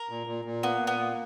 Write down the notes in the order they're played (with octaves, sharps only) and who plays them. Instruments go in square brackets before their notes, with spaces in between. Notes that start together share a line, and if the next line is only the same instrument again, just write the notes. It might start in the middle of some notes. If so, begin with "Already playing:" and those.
Already playing: [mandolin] A#4
[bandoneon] A#2
A#2
A#2
[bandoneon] A#3 [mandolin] B3
[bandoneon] A#2
[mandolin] B3
[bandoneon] A#3